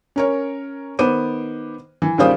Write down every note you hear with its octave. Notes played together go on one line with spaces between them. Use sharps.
C#4 A#4 C#5
D#3 B3 C5 D6 D#7
E3
D#2 C#3 G3 F4 C5 D#6